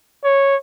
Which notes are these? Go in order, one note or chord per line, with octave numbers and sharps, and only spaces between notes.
C#5